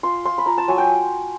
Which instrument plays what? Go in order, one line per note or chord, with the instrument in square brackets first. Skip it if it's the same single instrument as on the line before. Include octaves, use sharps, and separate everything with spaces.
[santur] F4 C6
F4 C6
B5
F4 A#5
A5
F#3 G#5
G5